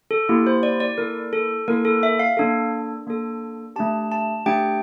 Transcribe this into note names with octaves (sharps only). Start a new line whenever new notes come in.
A4
A#3 E4 G4
C5
D5
D5
A#3 E4 A4 A#4
A4
A#3 E4 A4 A#4
A4
E5
F5
A#3 D4 A4
A#3 D4 A4
A3 D4 G4 A5
A5
A3 D4 G4 G5